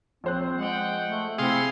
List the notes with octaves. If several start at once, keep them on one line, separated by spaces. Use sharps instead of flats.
A#1 C4 C5 F#6
G#3 F#5 G5
A3
C3 C4 E4 G#4 F5 C6